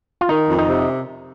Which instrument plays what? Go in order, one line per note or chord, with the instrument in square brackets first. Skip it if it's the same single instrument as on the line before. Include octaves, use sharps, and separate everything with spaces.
[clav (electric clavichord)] F4
[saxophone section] D#3 [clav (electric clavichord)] D#4
[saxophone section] F2
[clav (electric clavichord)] D#4
[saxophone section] C3